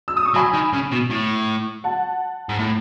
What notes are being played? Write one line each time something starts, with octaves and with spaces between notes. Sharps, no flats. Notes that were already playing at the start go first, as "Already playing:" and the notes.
E6
D#6
C#6
F#3 G#5 B5
D#3
C#3
B2
A2
F#5 A5
G#2
A2